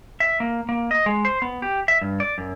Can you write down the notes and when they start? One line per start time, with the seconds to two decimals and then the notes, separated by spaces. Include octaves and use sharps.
0.20 E5
0.40 A#3
0.69 A#3
0.91 D#5
1.06 G#3
1.25 C5
1.42 B3
1.62 G4
1.88 E5
2.01 G2
2.20 D5
2.38 F#2